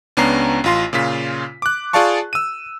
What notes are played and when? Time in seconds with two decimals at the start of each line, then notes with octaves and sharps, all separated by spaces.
0.17 C#2 B3 C#4 D4 A#5 C7
0.64 A1 F4 C6
0.93 A#2 C#3 F4 B6
1.62 D6 F#6
1.93 F4 G#4 D5 F5 A5 C#6
2.33 E6 D#7